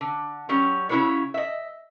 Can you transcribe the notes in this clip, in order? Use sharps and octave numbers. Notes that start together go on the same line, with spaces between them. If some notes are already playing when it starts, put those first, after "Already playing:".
D3
F#3 G3 C#4
C#3 C#4 E4 F#4 B4 C#5
D#5 E5